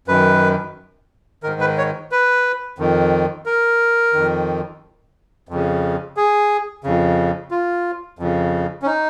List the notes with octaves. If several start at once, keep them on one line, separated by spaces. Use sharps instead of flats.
F#2 D#3 B4
G#2 D#3 A#4
B4
C#5
B4
F2 D#3
A#4
F2 D#3
F2 C#3
G#4
F2 C#3
F4
F2 C#3
C#4
D#4